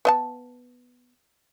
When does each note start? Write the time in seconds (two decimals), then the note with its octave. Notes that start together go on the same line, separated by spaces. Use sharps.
0.05 B3 D#5 A5